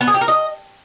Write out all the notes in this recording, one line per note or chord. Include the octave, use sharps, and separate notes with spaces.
B3
G#4
G4
A#4
D#5